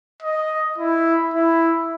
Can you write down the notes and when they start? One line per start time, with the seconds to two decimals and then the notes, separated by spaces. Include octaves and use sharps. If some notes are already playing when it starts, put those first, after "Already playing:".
0.23 D#5
0.78 E4
1.34 E4